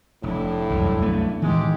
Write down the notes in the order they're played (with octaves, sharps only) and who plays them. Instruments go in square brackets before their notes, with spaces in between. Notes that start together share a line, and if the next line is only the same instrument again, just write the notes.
[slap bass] F1 [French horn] A2 [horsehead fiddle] D4 E4
[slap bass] D#1 [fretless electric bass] C2 F#2
[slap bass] A3 B3
[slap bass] A2 D#3 [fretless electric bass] E3 [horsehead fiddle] G#3 G4